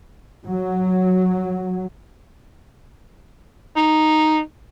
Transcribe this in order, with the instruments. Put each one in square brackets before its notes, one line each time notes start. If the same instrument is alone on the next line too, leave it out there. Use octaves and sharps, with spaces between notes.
[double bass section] F#3
[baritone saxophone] D#4